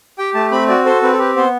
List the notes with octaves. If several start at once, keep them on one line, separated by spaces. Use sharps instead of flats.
G4 G5
A3 A5
C4 B5
F#4 D5
A4 C5
C4 B4
A4
G4 B4
B3 C5